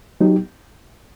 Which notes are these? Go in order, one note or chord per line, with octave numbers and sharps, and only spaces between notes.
F#3 B3 D#4 G4